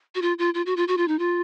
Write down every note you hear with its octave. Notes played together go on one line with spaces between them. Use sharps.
F#4
F4
F4
F4
F#4
F4
F#4
F4
D#4
F4